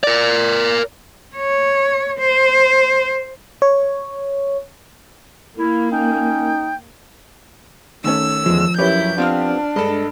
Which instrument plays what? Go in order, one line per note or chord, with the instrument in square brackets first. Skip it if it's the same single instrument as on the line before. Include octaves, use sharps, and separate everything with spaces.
[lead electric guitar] A#4 D5
[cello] C#5
C5
[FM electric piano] C#5
[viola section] A#3 [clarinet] E4
[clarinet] C#4 [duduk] D#4 [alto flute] G5
[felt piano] D#3 A3 C#4 [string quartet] E6
[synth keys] E2 D3 G#3 [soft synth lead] F3
[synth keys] F#2 [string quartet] E4 G6 [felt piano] G4 B4 C#5
[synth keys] B3 C4 G4 [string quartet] D4 [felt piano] F4 F6
[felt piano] G2 [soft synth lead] G#3 [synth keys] A4 D#5